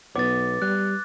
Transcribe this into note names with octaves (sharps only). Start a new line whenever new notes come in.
B1 B3 D6 A6
G3 F#6